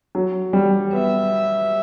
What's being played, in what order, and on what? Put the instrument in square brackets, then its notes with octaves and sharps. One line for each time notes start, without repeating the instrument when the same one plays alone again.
[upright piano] F#3
G3
[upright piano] B3 [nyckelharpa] E5